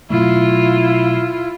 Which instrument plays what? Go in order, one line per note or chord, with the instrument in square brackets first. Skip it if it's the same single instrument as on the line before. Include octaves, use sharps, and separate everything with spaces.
[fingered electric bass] B2 F#3 A3 [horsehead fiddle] E4 F4